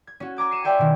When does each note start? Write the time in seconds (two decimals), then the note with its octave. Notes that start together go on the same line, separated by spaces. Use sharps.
0.07 G#6
0.20 C#4 F#4
0.37 G#5 A#5 D6 G#6
0.51 C7 C#7 D#7 E7
0.64 C#5 D5 E5 G5 G#5 C6
0.79 B2 D#3